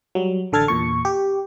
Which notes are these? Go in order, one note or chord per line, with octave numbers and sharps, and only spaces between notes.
F#3 G3
A1 D3 A4 F6 G#6 A6
E2 A#2 C#6
G4